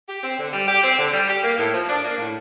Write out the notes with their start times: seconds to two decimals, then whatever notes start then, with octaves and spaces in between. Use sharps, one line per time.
0.09 G4
0.23 C4
0.39 D3
0.53 G3
0.68 G4
0.84 C4
0.99 D3
1.13 G3
1.29 G4
1.44 A#3
1.58 A2
1.74 F3
1.89 D4
2.04 A#3
2.18 A2